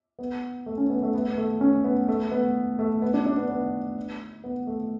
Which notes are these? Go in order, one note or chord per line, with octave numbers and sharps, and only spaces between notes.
B3
A3
C#4
B3
A3
B3
B3
A3
C#4
B3
A3
B3
A3
B3
D4
D4
B3
B3
B3
A3